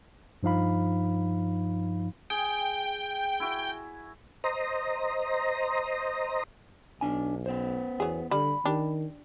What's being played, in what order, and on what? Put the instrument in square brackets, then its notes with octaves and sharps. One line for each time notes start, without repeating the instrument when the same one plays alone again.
[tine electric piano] G2 F3 D#4 F5 B5
[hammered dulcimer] G#4 [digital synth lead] G5
[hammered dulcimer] E4 F#4
[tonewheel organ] C5 D#5 A#5
[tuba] B1 [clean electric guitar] D4 G#5
[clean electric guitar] B3 C5
[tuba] E2 [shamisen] F#3 G#4
[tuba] D3 [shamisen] G3 [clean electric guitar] B5
[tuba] D#3 [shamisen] D4 G4